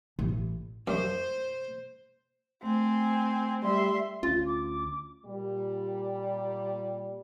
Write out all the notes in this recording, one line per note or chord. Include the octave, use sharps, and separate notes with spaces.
A1
F#2 C5
A3 C4 G#5
G3 E5 C6
D2 C#4 F4 A6
D6
A#2 G3